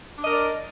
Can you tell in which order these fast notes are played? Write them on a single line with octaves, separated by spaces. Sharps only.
D4 D#5 A#4 D5